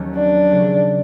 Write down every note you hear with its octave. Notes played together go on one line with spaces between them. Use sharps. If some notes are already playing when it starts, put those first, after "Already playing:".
Already playing: D#2 D#3 F#3 A3 C#4
D4
C#3 F#3 A3